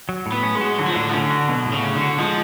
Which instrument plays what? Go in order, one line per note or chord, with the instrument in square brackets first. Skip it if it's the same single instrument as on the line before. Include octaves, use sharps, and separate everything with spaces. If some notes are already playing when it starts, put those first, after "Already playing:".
[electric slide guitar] F#3
A2
[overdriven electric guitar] B3
[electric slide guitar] C#4
[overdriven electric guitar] G#3
[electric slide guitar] F#4
[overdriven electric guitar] D3 [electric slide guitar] F#3
[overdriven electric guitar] F3
[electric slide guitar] A2 [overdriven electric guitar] D3
[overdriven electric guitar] F3
[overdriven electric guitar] D3 [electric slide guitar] C#4
[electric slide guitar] F#4
[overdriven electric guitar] B2 [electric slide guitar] F#3
[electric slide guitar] A2
[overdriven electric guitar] C#3
[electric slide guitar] C#4
[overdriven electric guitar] D3
[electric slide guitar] F#4
[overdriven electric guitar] F3 [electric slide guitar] G#3